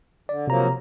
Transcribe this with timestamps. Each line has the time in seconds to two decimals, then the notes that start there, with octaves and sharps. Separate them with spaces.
0.29 D3 D5
0.47 C3 F3 F#3 A#3 A#5